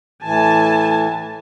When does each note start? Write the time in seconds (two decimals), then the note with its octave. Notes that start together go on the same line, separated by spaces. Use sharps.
0.22 A2 E3 G#5 A5